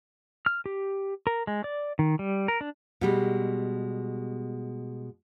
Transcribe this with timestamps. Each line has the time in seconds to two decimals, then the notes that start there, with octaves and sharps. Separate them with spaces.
0.46 F6
0.66 G4
1.27 A#4
1.47 G#3
1.64 D5
1.99 D#3
2.19 G3
2.48 A#4
2.61 D4
3.01 B2 G3 G#3